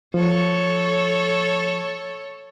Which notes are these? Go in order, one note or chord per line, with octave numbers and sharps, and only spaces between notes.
F3 A4 C#5